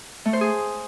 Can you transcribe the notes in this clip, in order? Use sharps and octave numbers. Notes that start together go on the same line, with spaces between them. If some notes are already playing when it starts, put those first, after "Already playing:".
A3
C5
G#4